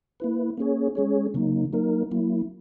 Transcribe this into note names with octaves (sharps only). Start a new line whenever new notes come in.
A#3 E4 B4
A#3 C#4 G#4 C#5
G#3 C#4 G#4 C#5
C#3 F#3 A#3 D#4
F#3 A#3 D#4 A#4
F#3 A#3 E4